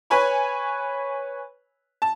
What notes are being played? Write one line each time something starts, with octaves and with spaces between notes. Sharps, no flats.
B4 C#5 G#5 B5 C#6
A5